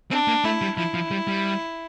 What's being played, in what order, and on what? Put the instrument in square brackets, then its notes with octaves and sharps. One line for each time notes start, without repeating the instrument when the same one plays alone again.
[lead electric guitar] C4 [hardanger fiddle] D4
[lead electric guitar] A#3
[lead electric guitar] A3 [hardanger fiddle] E4
[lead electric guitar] G3
[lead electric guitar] F3 [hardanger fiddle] E4
[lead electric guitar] F3
G3
G3